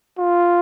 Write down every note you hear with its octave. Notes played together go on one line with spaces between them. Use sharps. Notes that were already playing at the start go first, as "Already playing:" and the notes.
F4